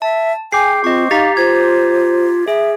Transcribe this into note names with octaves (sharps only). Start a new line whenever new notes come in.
E5 A5
G#4 G5 G#5 D6 G6 C7
C4 F4 D#5 C#6
D#4 G4 F5 A#5 A6 B6
F4 C5 G#6
G#4 E5